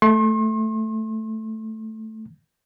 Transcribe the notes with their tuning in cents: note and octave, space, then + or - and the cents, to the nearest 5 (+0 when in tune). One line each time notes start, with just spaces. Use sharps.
A3 +0 C6 +45